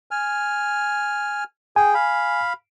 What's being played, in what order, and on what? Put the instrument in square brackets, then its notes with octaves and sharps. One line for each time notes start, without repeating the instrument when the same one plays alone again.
[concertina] G#5 F6
[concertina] G#4 G5 [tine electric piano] G#5
[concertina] F5 B5